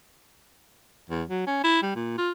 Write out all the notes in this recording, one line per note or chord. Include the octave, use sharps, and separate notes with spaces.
E2
F#3
C#4
E4
G3
A#2
F4